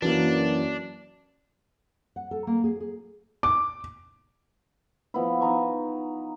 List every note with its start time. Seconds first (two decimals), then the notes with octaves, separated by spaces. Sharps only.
0.02 F#2 E3 F#3 A#3 D4
2.16 F#5
2.31 A4
2.47 A#3
2.64 G#4
2.80 G#4
3.43 D6
5.14 F3 B3 E4
5.41 D#4 D#5 A#5 C#6